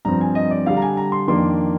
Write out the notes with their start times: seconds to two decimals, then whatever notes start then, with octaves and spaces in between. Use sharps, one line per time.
0.05 G2 F3 C4 A#5
0.21 G#5
0.35 D#5
0.51 D5
0.66 D3 G3 D4 F5
0.77 A#5
0.82 G#5
0.97 A#5
1.12 C6
1.28 F2 D#3 A#3 D4 C6